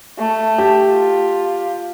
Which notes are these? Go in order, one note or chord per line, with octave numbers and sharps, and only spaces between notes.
A3
G4
F4